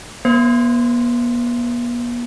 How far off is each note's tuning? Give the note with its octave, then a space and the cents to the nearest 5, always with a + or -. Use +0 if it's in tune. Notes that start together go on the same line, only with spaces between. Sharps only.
B3 -45 C5 +0